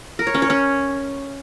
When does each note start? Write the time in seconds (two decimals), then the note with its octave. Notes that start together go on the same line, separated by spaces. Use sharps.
0.19 A#4
0.27 C#5
0.34 C#4
0.42 C#5
0.50 C#4